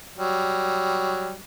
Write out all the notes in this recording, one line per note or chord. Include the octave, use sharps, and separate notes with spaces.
F#3 G3